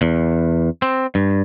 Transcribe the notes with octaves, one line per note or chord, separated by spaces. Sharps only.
E2
C4
G2